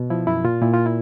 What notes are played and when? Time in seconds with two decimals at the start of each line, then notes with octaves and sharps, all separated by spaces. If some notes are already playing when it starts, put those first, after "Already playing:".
Already playing: B2
0.10 F3 E4
0.27 F#2 E4
0.44 A#2 F4
0.62 A#2 E4
0.74 F4
0.86 E4